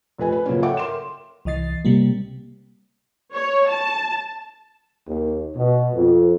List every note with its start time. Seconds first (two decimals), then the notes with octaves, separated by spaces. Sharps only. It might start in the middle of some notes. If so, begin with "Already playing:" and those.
0.18 F1 F2 B4 G#5
0.32 B4
0.46 C#3 F3 F#3 A#3 C#4
0.62 A4 C#5 E5 F#5 G5 D6
0.77 A#4 C6 E7
1.45 C2 E3 D#5 A6 C7
1.85 C3 G3 A#3
3.33 C#5
3.69 A5
5.07 D#2
5.55 B2
5.93 F2